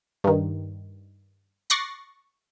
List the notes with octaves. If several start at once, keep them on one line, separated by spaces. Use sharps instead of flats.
G2 D#3
C#6 D6 F#6 A6 A#6 C7